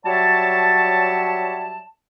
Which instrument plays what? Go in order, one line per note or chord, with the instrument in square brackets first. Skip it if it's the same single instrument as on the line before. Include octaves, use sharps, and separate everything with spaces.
[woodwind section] F#3 G3 C#5 E5 A5